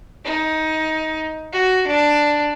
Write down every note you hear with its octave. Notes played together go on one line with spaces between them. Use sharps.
D#4
F#4
D4